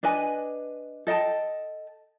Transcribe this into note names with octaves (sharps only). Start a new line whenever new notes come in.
D4 B4 D#5 G#5
A4 D#5 G5 A5